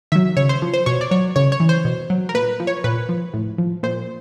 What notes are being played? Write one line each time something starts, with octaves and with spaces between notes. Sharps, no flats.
D#3 F#3 E5
C#3 C#5
C5
F3
C5
B2 C#5
D5
F#3 C#5
C#3 C#5
C#5
E3
C5
B2
F#3
A#4
A#2 B4
F3
C#5
A#2 B4
F3
A2
F3
A#2 C5